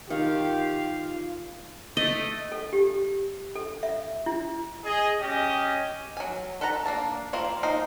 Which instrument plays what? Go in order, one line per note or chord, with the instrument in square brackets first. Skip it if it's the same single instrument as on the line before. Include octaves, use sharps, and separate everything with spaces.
[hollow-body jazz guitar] D#3 [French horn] F4 [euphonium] G4 [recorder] F5
[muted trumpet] A3 [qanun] D#5
[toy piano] A4
G4
A4
E5
E4
[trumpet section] G#4 D#5
C#4 G4 D#5
[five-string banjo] F#3 G#5
A4 B4 F#5 A5 A#5
A#3 D4 A5
A#3 C4 E4 F4 A#4
A#3 D#4 C5